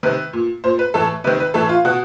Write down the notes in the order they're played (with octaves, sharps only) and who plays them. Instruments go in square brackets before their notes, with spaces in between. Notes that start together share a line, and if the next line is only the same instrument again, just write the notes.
[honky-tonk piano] C3 D#3 B4
A#2
A#2 C5
B4
A2 E3 A4
C3 B4
D#3
B4
A2 E3 A4
F4
B2 F#4